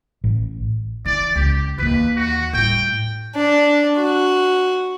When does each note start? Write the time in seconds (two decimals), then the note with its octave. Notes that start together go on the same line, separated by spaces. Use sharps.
0.24 A1
1.05 E3 D5
1.36 C#2 G4
1.78 D#2 E3 B4
2.16 F#4
2.53 A2 G3 G5
3.35 D4
3.97 F#4